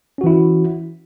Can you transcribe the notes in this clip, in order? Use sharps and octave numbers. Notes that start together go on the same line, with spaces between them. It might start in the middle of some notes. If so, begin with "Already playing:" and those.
E3 C#4 E4 F#4